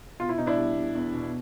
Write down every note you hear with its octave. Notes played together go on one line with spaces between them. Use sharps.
B2 F4
E4
B2 D#4
D4 E4
G3
B2
E2
B2